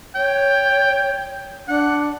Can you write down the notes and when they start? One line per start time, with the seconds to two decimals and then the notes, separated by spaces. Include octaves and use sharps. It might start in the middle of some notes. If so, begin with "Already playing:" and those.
0.15 C#5 G5
1.68 D4 F#5